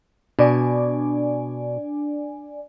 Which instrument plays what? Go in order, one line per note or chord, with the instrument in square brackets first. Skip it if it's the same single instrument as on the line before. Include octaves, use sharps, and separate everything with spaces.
[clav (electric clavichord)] B2 [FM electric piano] D4 D5 G#5